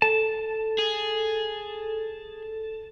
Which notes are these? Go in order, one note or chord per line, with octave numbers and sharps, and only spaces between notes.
A4 A5
G#4